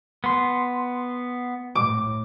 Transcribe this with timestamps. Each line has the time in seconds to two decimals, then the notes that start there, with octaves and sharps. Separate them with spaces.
0.24 B3 C6
1.75 A2 D6